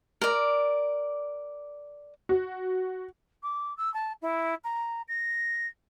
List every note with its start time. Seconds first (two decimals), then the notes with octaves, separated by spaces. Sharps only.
0.21 A#4 D5
2.29 F#4
3.42 D6
3.77 E6
3.93 A5
4.21 E4
4.64 A#5
5.08 A#6